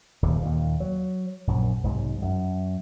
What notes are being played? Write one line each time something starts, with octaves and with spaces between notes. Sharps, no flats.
D#1 D#2 C3
D#2 A#2
F#3
A#1 F#2 A#2
B1 G#2 C3
F#2